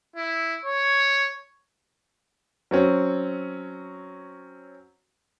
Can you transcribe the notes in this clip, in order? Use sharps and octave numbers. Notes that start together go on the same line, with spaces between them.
E4
C#5
F#3 C4 C#4